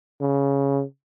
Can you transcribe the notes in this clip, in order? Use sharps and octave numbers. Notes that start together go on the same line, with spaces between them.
C#3